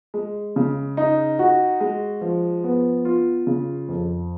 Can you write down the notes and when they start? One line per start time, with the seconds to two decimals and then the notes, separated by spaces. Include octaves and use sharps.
0.14 G#3
0.56 C#3
0.97 D#4
1.39 F#4
1.81 G#3
2.21 F3
2.64 B3
3.05 F4
3.47 C#3
3.88 F2